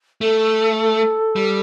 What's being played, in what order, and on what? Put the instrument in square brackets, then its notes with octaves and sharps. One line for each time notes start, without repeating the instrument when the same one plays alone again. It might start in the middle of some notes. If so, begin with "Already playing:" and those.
[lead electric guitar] A3 [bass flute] A4
[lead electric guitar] G3